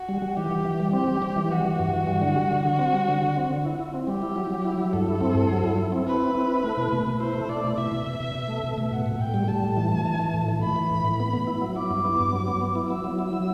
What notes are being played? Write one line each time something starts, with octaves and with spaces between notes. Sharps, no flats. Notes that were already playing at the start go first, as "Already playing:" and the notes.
Already playing: F#4
G3
G3
E3 G4
E3
E3
G3
C4 G4
G3
G3
E3
G3 F#4
E3
G2
E3
G3
D3
G3
D3
D3
C4
G3
D3
D3
C4
D3
E4
E4
C4
G3 G4
E4
F#3
F#3
E4
F#3
G2 A4
E4
C4
G2
F#3
E4
E4
C4
C4 B4
E4
C4
E4
A3
B2
B2
B2
E4 C5
A3
E4 D5
B2
B2 E5
B2
B2
B2
B2
A3
B2
B2
A2 F#5
A2
A2 G5
G3
G3 A5
A2
E3
E3
E3
E3
A2
E3
E3 B5
E3
A2
A2
B3
B3
E4
F#3
E4 D6
G2
B3
G2
F#3
B3
B3
E4
F#3 E6
F#3
E4
F#3